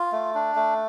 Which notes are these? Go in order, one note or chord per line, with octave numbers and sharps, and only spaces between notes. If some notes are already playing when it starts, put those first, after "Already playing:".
Already playing: F4
A3
D4
A3